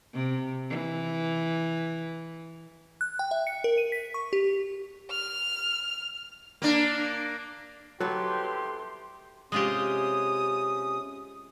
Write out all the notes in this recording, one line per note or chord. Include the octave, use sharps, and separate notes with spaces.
C3
E3
F#6
G5
E5
C#7
A#4
D#7
B6
C#6
G4
F6
A#3 D4
C2 F#3 B3 G4 A4 C6
C3 G#3 C#4 F4 G4 D#6